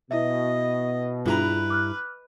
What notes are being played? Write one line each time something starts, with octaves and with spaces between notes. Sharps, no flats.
B2 E4 D#5 E5
G2 D4 E4 F4 G#4 B4 A#5
D6 F6 F#6